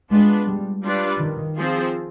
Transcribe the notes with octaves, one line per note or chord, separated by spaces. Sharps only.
G#3 B3 D4 F4 B4
G3
G3 D4 F4 B4 D5
D#3
F3 C4 F4 G#4